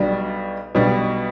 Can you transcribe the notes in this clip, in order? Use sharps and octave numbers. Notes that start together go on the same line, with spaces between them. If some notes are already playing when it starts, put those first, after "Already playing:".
Already playing: B1 B2 G3 D4
B1 B2 G3 D4